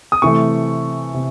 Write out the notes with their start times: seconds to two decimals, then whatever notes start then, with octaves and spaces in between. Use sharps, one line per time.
0.12 D#6
0.22 C3 E3 A3 C#6
1.14 C3